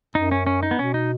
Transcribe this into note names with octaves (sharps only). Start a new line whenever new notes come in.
F#2 D#4
C#4
C#4
D#4
B3
B2 C#4
D#4